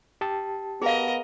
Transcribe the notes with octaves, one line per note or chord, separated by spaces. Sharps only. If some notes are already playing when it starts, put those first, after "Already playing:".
G4 A5
B3 G#4 A#4 D#5 F5